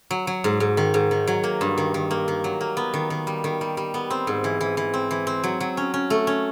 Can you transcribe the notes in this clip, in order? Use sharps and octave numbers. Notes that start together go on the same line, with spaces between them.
F#3
F#3
G#2
G#2
D#3
G#2
D#3
F#3
A#3
G2
D#3
D#3
A#3
D#3
F#3
A#3
B3
D#3
D#3
G3
D#3
G3
G3
B3
C4
G#2
E3
E3
E3
C4
E3
C4
F#3
F#3
C#4
C#4
A3
C#4